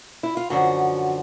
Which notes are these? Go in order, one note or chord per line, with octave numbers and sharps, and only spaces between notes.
E4
F4
F#2 D3 F3 F#4